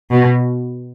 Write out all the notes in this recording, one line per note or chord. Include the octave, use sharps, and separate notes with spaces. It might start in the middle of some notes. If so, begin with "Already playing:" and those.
B2